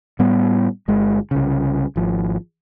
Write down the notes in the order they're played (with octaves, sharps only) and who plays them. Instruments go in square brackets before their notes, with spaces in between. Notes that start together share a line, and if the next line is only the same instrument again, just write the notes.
[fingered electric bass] A2 G3 B3
G1 G#3
C2 C#3
G#1 F3